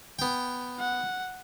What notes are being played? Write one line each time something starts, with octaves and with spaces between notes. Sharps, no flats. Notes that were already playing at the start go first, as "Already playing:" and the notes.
B3 G5
F#5